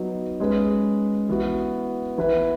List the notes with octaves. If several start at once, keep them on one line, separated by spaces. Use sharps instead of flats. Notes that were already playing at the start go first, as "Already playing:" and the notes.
Already playing: F#3 B3 D#4
G#3 C#4 G#4 B4
E3 B3 F#4
E3 B3 E4 B4